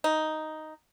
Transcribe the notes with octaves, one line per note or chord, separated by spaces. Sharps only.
D#4